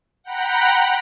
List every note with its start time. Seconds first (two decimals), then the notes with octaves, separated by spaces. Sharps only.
0.24 F#5 G5 A#5 B5 F#6